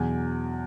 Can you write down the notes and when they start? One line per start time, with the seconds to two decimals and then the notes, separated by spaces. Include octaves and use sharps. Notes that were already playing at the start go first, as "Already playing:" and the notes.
Already playing: E2 B2 F#3 G#5